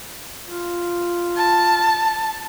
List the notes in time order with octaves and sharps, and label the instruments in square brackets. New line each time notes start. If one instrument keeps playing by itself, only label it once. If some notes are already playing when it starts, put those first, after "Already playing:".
[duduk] F4
[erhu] A5